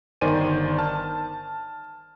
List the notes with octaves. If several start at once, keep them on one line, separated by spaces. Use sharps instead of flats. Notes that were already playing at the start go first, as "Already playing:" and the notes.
G1 D#3 C5 D5 G#5 D#7
A5 F6